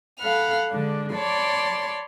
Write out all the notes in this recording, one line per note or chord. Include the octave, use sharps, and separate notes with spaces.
A4 F5 F#5 B5 F6
D3 G#3 D4
C#5 D5 A5 B5 C6